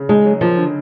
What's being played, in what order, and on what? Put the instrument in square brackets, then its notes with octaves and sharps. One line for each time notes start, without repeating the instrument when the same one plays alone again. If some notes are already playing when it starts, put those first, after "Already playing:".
Already playing: [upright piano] C#3
[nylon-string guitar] G#3 [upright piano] D#4
[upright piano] F#3
[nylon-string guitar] F3 [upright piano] A#3
[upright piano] D3